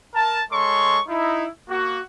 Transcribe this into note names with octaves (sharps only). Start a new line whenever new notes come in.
A#4 A5
G#3 A4 C#5 C6 C#6
D#4 E4
A#3 F#4